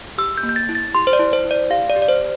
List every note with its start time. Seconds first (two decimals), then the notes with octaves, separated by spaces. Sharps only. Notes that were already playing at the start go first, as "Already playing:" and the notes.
0.18 G4 E6
0.38 G6
0.43 A#3
0.49 G6
0.56 A6
0.69 E4
0.75 A6
0.95 G4 C6
1.07 C5
1.13 D5
1.19 E4
1.33 C5
1.44 E4
1.51 D5
1.70 G4 F5
1.90 D5
1.96 G4
2.02 D5
2.08 C5